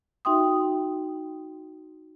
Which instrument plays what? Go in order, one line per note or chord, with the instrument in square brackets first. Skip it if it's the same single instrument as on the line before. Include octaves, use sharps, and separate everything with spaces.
[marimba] D#4 F#4 E5 G5 C6 D#6